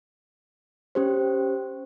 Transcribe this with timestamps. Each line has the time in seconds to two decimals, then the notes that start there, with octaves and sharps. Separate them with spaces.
0.95 C#4 G4 C5